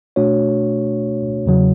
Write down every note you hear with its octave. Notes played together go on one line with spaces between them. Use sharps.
B2 A3 D4 F#4 C#5
E2 C#3 F#3